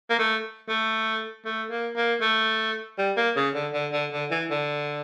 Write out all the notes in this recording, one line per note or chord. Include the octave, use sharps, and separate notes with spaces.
A#3
A3
A3
A3
A#3
A#3
A3
G3
A#3
C#3
D3
D3
D3
D3
E3
D3